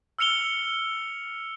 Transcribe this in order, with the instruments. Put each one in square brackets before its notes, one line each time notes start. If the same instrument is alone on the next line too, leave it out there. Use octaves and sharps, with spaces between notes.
[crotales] E6 F6 C#7 F7 G7